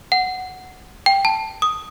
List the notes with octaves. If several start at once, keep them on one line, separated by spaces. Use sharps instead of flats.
F#5
G5
A5
D#6